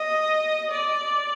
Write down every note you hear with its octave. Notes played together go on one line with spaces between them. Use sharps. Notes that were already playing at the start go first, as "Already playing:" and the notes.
Already playing: D#5
D5